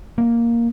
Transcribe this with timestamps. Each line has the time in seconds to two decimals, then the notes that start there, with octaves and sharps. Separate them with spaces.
0.18 A#3